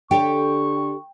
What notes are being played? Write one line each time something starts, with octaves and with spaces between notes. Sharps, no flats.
D3 G4 A4 C#5 G5 C#6